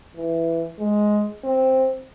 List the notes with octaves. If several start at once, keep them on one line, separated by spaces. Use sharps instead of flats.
E3
G#3
C4